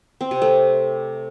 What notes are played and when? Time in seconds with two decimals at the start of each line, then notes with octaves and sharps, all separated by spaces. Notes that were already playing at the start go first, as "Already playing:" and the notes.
0.21 C4
0.31 C3
0.42 A3